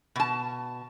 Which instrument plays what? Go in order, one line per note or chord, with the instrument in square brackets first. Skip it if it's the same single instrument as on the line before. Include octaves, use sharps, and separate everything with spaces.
[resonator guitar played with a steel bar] B2 A5